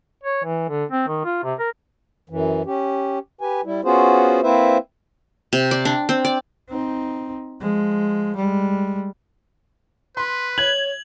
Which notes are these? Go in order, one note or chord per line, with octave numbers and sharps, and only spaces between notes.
C#5
E3
D3
C4
D#3
F4
C3
A#4
F#2 E3
C#4 G4
G4 B4 G#5
G3 E4
B3 C#4 F4 F#4 G#4 C5
A#3 C4 E4 B4 C5 E5
C3
D5
D4
C4
D5
C4 D#4
F3 G#3
G3 G#3
B4 C6
C#5 G#6 F#7